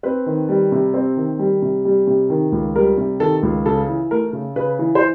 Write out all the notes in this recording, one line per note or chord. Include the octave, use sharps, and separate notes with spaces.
C4 B4
D#3
G3
C3
C4
D#3
G3
C3
G3
C3
D#3
C#2
G3 A#4
C3
D#3 A4
C#2
C#3 A4
E3
A3 A#4
C#3
C#3 B4
E3
C5